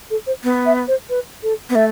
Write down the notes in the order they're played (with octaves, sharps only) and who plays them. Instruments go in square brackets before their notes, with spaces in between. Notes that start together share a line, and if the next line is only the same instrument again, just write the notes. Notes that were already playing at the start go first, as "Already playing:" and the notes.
[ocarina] A4
C5
[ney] B3
[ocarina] E5
C5
B4
A4
[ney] B3
[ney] A3 [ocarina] E5